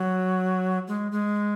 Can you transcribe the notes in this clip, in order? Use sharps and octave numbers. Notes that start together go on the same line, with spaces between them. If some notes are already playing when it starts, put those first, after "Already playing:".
Already playing: F#3
G#3
G#3